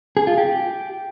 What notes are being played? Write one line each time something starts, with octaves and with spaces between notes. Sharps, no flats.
G#4
F4
G4